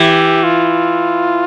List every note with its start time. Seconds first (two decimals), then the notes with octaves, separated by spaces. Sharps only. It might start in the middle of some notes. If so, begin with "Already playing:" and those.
Already playing: E3 G4
0.44 F4